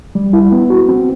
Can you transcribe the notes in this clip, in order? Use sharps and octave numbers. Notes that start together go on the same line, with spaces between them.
G3
E4
B3
F#4
C4